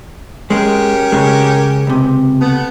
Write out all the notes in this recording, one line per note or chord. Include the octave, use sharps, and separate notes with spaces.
G#3 C#4 G4 A#4
C#3 G#3
C#2 C3
A3 B3